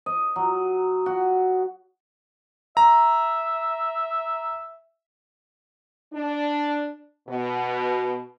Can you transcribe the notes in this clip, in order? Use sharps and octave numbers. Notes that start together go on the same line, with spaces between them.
D#5
F#3
F#4
E5 A#5
D4
B2